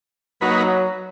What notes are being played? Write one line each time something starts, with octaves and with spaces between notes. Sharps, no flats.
F#3 A#3 D#4 F#4 B4